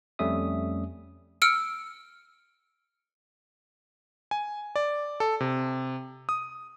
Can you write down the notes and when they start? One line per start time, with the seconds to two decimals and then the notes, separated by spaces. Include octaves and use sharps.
0.19 F2 G3 A3 C#4 E5 D#6
1.42 E6 F6 C#7 D7
4.31 G#5
4.76 D5
5.20 A4
5.40 C3
6.29 D#6